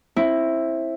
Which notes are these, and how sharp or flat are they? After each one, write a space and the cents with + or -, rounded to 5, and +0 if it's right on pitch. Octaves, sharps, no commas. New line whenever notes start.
C4 +25 E4 +0